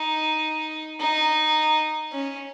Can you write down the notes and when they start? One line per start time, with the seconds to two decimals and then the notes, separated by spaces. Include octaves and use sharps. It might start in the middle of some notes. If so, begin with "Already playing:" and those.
Already playing: D#4
1.00 D#4
2.12 C#4